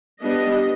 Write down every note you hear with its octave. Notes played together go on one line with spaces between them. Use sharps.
G3 B3 D4 D#5